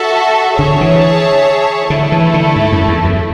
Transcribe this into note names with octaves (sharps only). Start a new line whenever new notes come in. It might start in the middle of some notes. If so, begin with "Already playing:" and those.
Already playing: F#4 A4 E5
D3 G#4 C#5 E5 A5
E3
D3 A3 E4 A4
E3
D3
G#2
F#2
E2
F#2